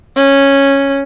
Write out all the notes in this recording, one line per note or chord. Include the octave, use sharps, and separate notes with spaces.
C#4